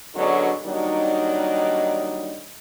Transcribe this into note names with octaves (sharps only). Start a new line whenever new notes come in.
B2 D3 F#3 G#3 C#4 D4
D#3 F#3 G3 A#3 D4 D#4